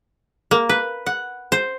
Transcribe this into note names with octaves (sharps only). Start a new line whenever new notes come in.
A#3
B4
F#5
C5